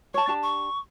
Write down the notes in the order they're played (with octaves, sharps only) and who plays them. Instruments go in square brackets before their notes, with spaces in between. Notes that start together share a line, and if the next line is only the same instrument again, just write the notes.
[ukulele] C#5 A5 [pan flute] C#6
[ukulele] D4 G4 A5
[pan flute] C#6